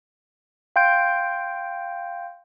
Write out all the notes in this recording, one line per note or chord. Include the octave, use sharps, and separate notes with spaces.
F5 G5 C6 G6 D7